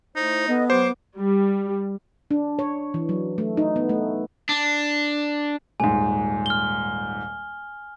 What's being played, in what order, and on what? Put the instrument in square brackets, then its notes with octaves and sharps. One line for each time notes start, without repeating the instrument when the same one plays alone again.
[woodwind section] A3 E4 C5 [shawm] D#4
[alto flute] B3 [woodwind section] A4 D#5
[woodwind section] F#3 A3 G4 [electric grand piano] C5 [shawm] D6
[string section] G3
[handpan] D4
C#5
E3
F#3
A3
D#4
B3
A3
[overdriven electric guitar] D4
[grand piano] D#1 G#2 [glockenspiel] G#5
[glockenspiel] F6 G7